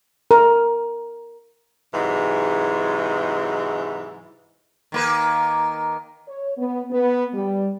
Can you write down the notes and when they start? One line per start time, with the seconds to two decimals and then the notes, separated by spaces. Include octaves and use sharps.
0.31 A#4
1.94 G#2 C3 E3 F#3 G#3
4.92 D#3 A#3 B4
6.29 C#5
6.58 B3
6.91 B3
7.34 G3